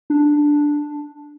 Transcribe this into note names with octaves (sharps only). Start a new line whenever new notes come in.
D4